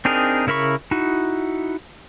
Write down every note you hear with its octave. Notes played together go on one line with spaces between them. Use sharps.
C4 D4 D#4 G#4 A#4
C#3 E4 A#4 B5 C#6
D#4 E4 F#4